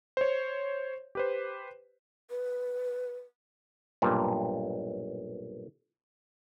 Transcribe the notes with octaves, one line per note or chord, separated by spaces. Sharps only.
C5 C#5
G4 B4 C5
B4
B1 G2 A#2